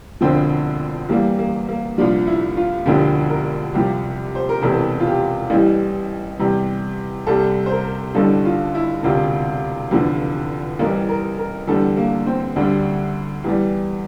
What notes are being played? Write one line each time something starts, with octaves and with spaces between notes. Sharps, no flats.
E1 D2 D3 F3 C4
E2 E3 G3 A#3
A#3
A#3
C2 A#2 F3 D4
E4
F4
E1 D2 D3 F3 G4
A#4
C2 C3 F3 G4
C5
A#4
E1 E2 C3 E3 A4
F4
G4
A1 A2 E3 G3
E2 C3 G3
C2 C3 G3 A4
C5
A#4
A1 G2 D3 G3 A4
F4
E4
E1 D2 C3 F4
F1 E2 D3 F3
A1 A2 E3 G3 A#4
A#4
A#4
E2 D3 G3 A4
A#3
C4
D2 D3 G3 D4
E2 E3 G3